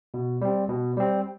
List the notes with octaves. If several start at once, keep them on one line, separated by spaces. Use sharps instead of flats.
B2
G3 C4
B2
G3 C4